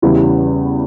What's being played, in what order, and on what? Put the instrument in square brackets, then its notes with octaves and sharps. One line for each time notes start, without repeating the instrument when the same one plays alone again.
[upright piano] E2 C#3 E3 G3 E4